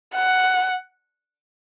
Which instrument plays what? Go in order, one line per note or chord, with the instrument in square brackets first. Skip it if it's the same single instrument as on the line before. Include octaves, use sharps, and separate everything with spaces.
[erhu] F#5